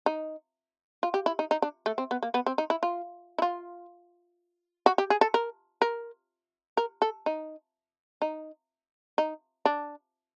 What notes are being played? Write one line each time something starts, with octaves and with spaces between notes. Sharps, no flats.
D#4
F4
G4
E4
D#4
D#4
D4
A3
C4
B3
A#3
B3
C4
D#4
E4
F4
E4
F4
F#4
G4
G#4
A4
A#4
A#4
A#4
A4
D#4
D#4
D#4
D4